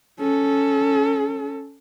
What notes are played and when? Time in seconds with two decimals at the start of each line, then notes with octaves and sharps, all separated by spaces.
0.20 C#4 A4